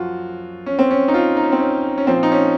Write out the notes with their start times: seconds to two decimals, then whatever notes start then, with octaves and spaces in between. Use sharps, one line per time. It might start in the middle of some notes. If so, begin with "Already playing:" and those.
Already playing: F#2 F3 F4 F#4
0.66 C#4
0.79 C4
0.91 C#4
1.08 D#4
1.14 F4
1.37 D#4
1.44 C#4
1.52 C4
1.59 C#4
1.98 C#4
2.07 A#2 F3 C4
2.23 D#4
2.32 C#4